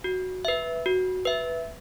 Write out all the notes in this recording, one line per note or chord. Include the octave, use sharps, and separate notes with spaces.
F#4
B4 E5
F#4
B4 E5